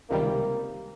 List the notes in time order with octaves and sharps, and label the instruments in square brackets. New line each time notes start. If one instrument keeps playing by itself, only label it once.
[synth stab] C#2 C3 D#3 G3 [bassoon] A#3